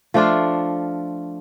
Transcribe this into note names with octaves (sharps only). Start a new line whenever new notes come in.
F3 A3 D4 F4